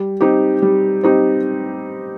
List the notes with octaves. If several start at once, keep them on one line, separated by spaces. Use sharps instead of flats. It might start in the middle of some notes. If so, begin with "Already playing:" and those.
Already playing: G3
C4 D#4 G4
G3
C4 D#4 G4